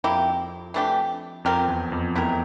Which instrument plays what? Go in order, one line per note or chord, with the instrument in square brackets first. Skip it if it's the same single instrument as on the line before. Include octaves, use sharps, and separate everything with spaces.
[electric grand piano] F2 [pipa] A#3 E4 G4
[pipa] E3 A3 D4 G4
[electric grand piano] F2 [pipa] F3 C4 G4 A#4
[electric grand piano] E2
F2
[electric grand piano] E2 [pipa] A3 E4 G4 A#4